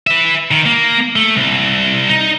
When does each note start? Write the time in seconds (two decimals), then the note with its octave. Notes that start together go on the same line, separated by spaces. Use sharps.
0.07 B4 E5
0.51 D#3
0.66 A#3
1.16 A3
1.37 C2
2.09 D#4